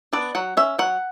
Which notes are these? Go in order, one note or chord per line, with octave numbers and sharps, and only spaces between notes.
B3 D4 D5
F#3 F#5
C#4 E5
F#3 F#5